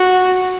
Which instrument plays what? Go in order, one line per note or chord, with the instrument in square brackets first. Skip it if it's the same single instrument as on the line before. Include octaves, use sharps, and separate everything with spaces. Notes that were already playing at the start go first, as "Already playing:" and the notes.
Already playing: [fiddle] F#4